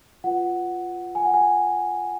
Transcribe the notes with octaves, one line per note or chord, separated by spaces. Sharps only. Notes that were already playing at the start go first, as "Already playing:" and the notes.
F4 B4 F#5
G#5
F#5
G#5